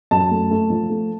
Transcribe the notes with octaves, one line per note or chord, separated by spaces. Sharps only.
F#2 A5
A3
A3
F3
A3